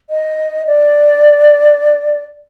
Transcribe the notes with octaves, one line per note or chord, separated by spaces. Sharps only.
D#5
D5